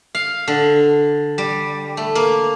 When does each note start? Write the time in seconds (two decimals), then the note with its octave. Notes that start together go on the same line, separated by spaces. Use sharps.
0.15 F5
0.48 D3
1.38 G3
1.97 A3
2.15 A#3